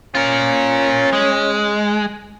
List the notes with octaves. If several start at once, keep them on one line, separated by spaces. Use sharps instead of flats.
C#4 F4 A#4
G#3